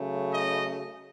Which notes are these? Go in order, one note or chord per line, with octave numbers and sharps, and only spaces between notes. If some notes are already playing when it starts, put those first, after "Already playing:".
Already playing: C#3 F#3 A3
D#5